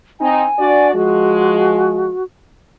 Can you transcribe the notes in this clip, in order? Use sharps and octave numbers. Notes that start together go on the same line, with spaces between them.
C4 D#4 G#5
D4 F#4 D5
F3 G#3 F#4